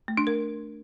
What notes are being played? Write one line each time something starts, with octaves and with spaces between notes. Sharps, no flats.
A3
D4
A#4